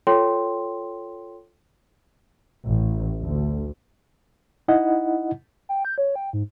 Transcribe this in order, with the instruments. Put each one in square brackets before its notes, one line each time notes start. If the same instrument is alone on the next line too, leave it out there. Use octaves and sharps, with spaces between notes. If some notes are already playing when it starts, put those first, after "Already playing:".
[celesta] F4 A4 C#5 G5 C6
[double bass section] A1
D2
[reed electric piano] D#4 E4 D#5 F#5
[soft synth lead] G5
G6
C#5
G5
G#2